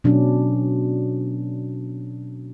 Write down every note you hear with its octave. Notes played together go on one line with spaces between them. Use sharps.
B2 F#3 C#4 D4